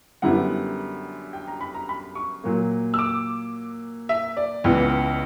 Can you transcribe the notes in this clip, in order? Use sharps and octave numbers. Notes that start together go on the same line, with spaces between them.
F#2 D3 G3 B3 E4 F#5
G5
A#5
B5
A#5
B5
C#6
A#2 F#3 A#3
E6
D6
E5
D5
C#2 C#3 E3 B3